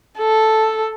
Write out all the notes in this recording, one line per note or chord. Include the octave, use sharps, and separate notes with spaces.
A4